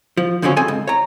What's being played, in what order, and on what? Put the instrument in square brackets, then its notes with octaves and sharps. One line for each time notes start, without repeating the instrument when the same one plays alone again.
[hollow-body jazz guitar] F3
F2 D3 F3 C4 C#4 F#4
G2 C4 G#4 A4 G#5
C#2
C#5 A#5